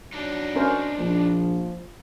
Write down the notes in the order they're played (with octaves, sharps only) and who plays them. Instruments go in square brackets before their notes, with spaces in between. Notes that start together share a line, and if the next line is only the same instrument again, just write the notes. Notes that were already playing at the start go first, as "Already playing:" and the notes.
[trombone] F#3 [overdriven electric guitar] D4 D#4
[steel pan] C#4 A#4 C5
[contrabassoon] A#1 [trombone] F3